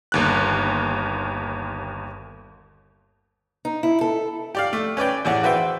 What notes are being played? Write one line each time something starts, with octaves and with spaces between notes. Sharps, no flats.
G1 D#2 F#6
D#4
E4
A4
G4 D5 F5
A3
C#4 B4 D5 G5
A1 E2 D5 F#5
F#4 B4 C5 E5 G5